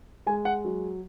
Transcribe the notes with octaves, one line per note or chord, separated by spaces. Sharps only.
G#3 G#5
F#5
F#3